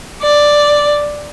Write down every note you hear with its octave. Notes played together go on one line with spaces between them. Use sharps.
D5